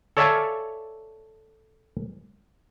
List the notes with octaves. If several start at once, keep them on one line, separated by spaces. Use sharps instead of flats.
A4 C#5 D5 E5 F5 G#5